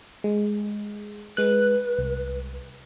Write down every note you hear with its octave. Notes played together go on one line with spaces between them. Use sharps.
G#3
G#3 B4 F#6
C2